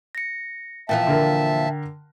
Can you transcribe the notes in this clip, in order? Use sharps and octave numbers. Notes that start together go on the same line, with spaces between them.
A#6 C#7
A#2 E3 F3 E5 G5 A5
D3 A#4